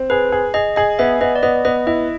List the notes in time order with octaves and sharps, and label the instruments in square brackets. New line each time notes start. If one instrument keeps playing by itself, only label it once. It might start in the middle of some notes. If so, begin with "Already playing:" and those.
Already playing: [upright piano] C4
[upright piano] G#4 [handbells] B4
[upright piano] G#4
[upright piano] G#4 [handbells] D#5
[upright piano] G#4 [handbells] D#5
[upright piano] B3 [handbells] E5
[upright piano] B3 [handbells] D#5
[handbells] D5
[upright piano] B3 [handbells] D#5
[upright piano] B3 [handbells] D#5
[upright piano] E4 [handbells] D#5